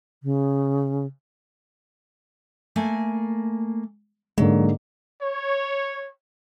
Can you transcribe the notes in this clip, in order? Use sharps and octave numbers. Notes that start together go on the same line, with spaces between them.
C#3
A3 A#3 G#5
G#2 D3 F#3 A#3
C#5